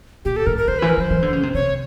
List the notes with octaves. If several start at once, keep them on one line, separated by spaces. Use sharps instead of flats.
A#2 G4
A4
A2 A#4
A#4
D#3 C5
E3 B4
A#4
F3 C5
E3
D3
C#3
C3
C3 C#5